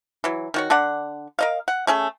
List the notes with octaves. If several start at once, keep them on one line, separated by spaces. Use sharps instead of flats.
E3 F#3
D#3 F#4 C#5
D3 D4 D5 F#5
A#4 D#5 F5
F#5
A3 C#4 G#4